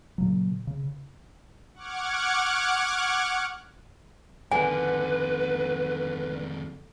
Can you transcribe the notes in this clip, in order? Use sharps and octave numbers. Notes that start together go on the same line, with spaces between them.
A#2 C#3 F#3
C#3
F#5 C#6 D6 F6 F#6 G#6
F2 D3 D#3 B4 G#5